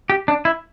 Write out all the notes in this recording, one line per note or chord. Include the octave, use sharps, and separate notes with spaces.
G4
D4
E4